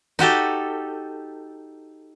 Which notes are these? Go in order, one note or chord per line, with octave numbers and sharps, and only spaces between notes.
D#4 F#4 G4 A4